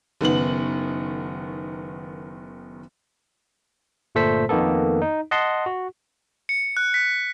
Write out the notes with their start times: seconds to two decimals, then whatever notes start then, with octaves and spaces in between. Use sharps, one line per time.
0.21 F#1 D#3 B3 F#7
4.15 G1 A#2 A3 A4 C5 B6
4.49 F2 D#3 A#3 B3 A4
5.02 D#4
5.31 D#5 F#5 A5 C6
5.66 F#4
6.49 C#7
6.77 F#6
6.94 B6